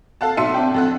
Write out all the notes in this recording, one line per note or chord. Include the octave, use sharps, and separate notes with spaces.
A4 F5 F#5 A5
B1 E5 C6 C#7 D#7
C4 D4 G5
F2 A4 F#5